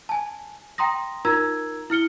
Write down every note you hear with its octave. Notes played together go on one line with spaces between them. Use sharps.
G#5 A5
G5 A#5 C6 D#6 A#6
D#4 F4 A#4 A#5 E6 G#6
E4 F6 C#7 G7